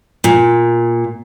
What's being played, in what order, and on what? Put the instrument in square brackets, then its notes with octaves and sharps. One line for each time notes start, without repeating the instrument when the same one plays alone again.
[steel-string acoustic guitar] A#2